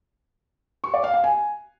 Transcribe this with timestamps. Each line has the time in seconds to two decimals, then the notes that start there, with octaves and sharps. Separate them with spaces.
0.84 C#6
0.94 D5
1.04 F5
1.14 F5
1.24 G#5